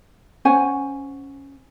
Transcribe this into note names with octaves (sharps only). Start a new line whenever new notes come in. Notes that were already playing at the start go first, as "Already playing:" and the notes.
C#4 C5 F#5 G#5